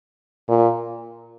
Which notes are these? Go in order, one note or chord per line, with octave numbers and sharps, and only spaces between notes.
A#2